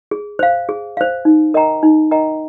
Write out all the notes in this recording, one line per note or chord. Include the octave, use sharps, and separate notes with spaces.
G#4
C5 F5
G#4
C5 F5
D#4
A#4 D#5 G5 A#5
D#4
A#4 D#5 G5 A#5